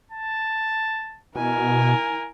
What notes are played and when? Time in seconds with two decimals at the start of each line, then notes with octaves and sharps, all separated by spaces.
0.12 A5
1.36 B2 E4 A#4 G#5